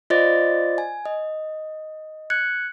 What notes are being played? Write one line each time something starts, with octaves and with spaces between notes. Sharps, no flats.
F4 C5 D5 D#5 A6
G#5
D#5
F#6 G#6 C#7